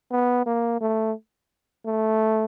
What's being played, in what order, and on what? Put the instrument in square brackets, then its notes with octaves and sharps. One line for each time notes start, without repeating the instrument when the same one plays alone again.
[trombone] B3
A#3
A3
A3